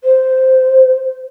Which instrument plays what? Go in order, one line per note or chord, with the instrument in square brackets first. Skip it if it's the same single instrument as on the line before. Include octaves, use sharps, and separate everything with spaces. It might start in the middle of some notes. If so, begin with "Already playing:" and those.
[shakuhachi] C5